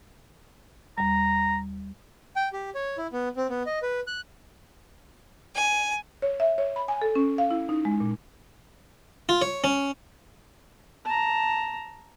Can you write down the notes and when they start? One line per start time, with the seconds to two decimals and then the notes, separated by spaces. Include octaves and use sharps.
0.98 D#2 G3 A#5
2.36 G5
2.53 G4
2.75 C#5
2.98 E4
3.13 B3
3.36 C4
3.49 B3
3.66 D#5
3.82 B4
4.07 F#6
5.55 G#5
6.22 C#5
6.40 E5
6.58 C#5
6.76 B5
6.88 G#5
7.02 A4
7.15 C#4
7.38 F5
7.51 E4
7.69 D#4
7.85 G#3
8.00 A#2
9.29 F4
9.42 C#5
9.64 C#4
11.05 A5 A#5